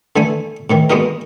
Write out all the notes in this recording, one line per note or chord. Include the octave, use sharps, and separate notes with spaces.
D3 E3 A3 G#5
A2 D#3 E3
G#3 A#3 B3 D#4 F#4 A#4